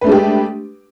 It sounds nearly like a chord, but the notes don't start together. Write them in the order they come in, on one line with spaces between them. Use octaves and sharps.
B4 A3 D4 G#3 G4